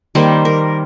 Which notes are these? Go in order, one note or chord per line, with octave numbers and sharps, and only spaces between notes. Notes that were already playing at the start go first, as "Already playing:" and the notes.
D#3 G3 A#3 C5
A#4